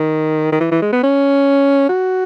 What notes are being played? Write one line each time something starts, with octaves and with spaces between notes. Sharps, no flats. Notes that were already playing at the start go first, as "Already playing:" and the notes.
Already playing: D#3
D#3
E3
E3
G#3
B3
C#4
F#4